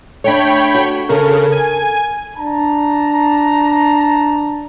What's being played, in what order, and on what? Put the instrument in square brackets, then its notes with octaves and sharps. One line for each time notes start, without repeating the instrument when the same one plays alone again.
[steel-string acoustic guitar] A3 D4 [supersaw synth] C#5 G5 B5
[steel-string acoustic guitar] F#4
[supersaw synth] C#3 [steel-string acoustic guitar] A4 A#4
[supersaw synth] G#5
[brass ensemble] D4 A5 A#5